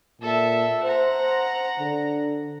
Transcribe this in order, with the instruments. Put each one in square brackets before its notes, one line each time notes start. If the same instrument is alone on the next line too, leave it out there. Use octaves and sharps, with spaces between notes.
[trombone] A#2 [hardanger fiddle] A4 E5
[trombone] C5 [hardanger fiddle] F#5 A#5
[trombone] D3